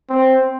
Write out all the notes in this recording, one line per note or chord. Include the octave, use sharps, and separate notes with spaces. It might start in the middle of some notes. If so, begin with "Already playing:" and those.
C4